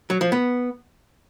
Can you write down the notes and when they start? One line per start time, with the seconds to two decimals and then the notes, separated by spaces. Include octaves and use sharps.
0.10 F#3
0.21 F3
0.32 B3